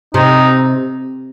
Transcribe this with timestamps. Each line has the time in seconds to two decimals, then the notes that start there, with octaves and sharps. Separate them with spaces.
0.14 C3 D#4